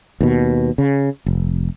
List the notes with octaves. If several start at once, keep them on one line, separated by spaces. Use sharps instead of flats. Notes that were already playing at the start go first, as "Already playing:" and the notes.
D#2 B2
C#3
F1